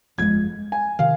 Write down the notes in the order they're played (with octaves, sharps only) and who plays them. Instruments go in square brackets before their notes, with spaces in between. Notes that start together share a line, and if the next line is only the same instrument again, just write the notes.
[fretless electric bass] G1 F2 C#3 G#3 [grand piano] G#6
[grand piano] G#5
[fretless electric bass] C3 D#3 [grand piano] F5